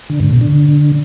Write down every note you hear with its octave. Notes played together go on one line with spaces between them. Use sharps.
D3
G#2
B2
D3